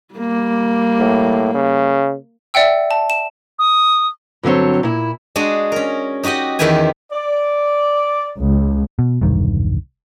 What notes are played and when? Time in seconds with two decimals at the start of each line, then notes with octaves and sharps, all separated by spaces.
0.14 G3 A#3
0.99 A2
1.54 C#3
2.54 D5 E5 F#5 G5 E6
2.91 A5
3.10 E7
3.59 D#6
4.43 G2 D3 F#3 C4 C#5
4.83 A#2 E4
5.36 G#3 D4 F#4 G#4
5.72 C#4 A#4
6.23 D#4 F#4 G4 D#5 F#5
6.59 E2 D#3 E4 G4 B4 G#5
7.12 D5
8.41 C#2
8.99 B2
9.21 E1 C2 G2 D#3